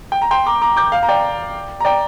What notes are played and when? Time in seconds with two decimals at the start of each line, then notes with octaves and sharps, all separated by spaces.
0.12 G5
0.22 A#5
0.31 G5 C6
0.46 A#5 D6
0.62 A#5 D6
0.77 D6 G6
0.92 F5
1.03 A#5
1.09 D5 G5
1.80 A#5
1.85 D5 G5